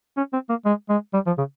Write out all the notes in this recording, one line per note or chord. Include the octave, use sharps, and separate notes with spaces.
C#4
C4
A#3
G#3
G#3
G3
F3
C#3